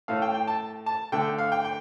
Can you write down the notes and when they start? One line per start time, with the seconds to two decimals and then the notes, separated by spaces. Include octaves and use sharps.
0.08 A2 A3 F5
0.22 G5
0.34 G5
0.48 A5
0.86 A5
1.12 D3 A3 G5
1.38 F5
1.52 G5
1.65 G5